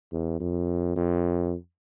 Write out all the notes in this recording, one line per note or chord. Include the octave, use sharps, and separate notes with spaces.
E2
F2
F2